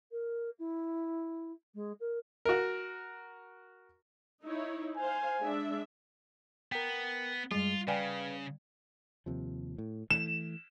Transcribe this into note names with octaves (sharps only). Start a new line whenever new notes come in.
A#4
E4
G#3
A#4
F#4 A#4
D#4 E4 C#5
C5 F5 G#5
G#3 D4 E5
B3 A#4 G5
F#2 G3 G#3 F4
C#3 B4 D5 F5 G5 G#5
D#2 C3 F3
A2
E3 A3 E7